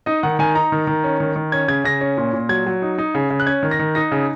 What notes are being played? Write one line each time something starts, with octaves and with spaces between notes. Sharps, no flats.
D#4 D#5
D#3 F#5
D#3 G#5
D#4 A#5
D#3
D#3
C#4
D#3
D#3
C#4 G#6
C#3 G#6
C#3 A#6
C#4
A#2
A#2
F#3 G#6
F#3
D#4
D#4
C#3
C#3
F#6
C#4 G#6
D#3
A#6
D#3
D#4 A#6
C#3